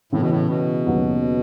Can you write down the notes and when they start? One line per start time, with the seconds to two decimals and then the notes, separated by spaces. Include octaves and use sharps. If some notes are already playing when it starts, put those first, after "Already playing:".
0.12 A2 C#3 E3 B3
0.21 B2
0.30 A2
0.49 B2
0.86 D#2 C#3 F#3 B3